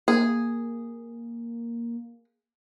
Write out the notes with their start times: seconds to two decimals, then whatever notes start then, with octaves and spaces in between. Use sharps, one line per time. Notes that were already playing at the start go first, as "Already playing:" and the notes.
0.08 A#3 G#4